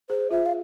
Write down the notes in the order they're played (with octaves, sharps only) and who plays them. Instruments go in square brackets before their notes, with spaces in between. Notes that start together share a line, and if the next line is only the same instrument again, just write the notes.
[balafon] G#4 [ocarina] C5
[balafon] F4 [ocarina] E5
[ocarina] F5